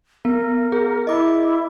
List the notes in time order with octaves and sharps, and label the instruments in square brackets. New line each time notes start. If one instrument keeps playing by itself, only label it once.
[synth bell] B3 [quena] A#4
[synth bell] G#4
[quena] E4 [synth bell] D#5 D6